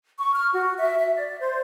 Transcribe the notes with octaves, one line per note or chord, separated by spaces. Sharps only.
C#6
F6
F#4
E5
E5
D5
C5